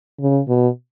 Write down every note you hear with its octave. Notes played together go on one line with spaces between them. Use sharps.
C#3
B2